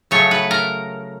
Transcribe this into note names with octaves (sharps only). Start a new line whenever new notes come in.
C#3 F#3 A3 C#5
B4
A#4